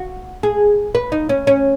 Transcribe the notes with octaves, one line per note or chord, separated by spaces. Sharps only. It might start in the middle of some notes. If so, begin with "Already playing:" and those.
Already playing: F#4
G#4
B4
D#4
C#4
C#4